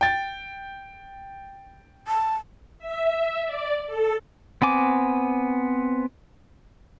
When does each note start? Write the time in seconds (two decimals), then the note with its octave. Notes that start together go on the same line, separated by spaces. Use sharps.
0.01 G5 A6
2.08 A5
2.79 E5
3.45 D5
3.87 A4
4.62 B3 C4 G#5 D6